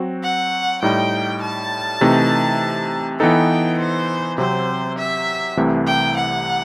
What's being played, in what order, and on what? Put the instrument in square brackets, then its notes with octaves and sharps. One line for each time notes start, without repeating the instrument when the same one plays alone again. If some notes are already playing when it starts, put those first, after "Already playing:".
Already playing: [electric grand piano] F#3 C4 F#4
[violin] F#5
[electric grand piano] A2 G3 D#4 [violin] G5
[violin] A5
[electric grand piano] C3 E3 A3 D#4
[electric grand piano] E3 B3 D#4 A4 [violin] G5
[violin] C5
[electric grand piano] C3 F#3 C4 [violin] C5
[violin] E5
[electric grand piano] C2 C3 E3 A3
[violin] G5
F#5